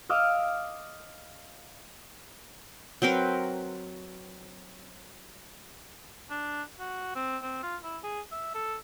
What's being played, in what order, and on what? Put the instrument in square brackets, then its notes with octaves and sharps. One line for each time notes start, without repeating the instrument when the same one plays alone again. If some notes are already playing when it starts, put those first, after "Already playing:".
[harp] D#5 F5 D6 E6 F6
[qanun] F#3 C4 A#4 B4
[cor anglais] D4
F#4
C4
C4
F4
E4
G#4
E5
A4